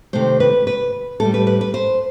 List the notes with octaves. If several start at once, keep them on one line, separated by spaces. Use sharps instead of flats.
C3 D#3 A3 C5
B4
B4
A2 G3 A4
B4
B4
B4
C5